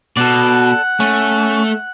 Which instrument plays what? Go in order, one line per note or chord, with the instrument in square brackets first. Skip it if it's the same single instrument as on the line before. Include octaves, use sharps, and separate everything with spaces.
[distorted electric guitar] B2 [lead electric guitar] A4 D5 [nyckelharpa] F#5
[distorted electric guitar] A3 [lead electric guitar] C#4